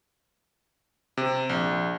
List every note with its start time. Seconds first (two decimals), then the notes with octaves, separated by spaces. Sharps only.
1.17 C3
1.49 A#1